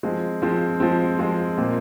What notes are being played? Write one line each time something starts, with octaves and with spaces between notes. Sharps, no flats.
F3 G#3 C4
F3 G#3 C4
F3 G#3 C4
F3 G#3 C4
A#2 G#3 C4